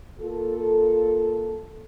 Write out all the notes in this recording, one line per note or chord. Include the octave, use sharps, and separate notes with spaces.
A#3 F4 A4